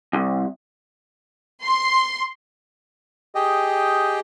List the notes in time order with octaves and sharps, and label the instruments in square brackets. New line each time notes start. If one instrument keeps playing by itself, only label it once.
[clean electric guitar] C2
[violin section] C6
[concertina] G4 G#4 D#5 G5